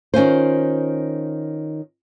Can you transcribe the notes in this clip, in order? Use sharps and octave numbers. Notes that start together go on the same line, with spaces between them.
D#3 C#4 F4 C5